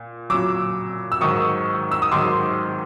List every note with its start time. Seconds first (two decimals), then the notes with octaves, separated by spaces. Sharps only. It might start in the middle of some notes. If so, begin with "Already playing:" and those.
Already playing: A#2
0.30 A#2 F#3 D6 E6
1.12 E6
1.20 G#2 D#3 F#3 C#6 D#6
1.91 E6
2.02 D#6
2.11 G#2 D#3 F#3 C6 D6